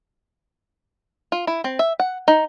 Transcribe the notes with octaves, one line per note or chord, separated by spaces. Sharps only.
F4
E4
C4
E5
F#5
D#4